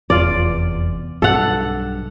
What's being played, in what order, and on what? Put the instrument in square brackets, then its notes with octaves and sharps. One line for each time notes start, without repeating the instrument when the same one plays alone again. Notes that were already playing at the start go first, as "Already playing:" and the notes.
[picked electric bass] F1 E2 [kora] F4 D5
[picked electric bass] B1 G2 [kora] A4 F#5